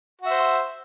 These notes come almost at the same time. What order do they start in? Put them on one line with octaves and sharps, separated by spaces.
F#4 E5 C5